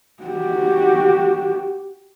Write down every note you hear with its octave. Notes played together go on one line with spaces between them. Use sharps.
F#4 G4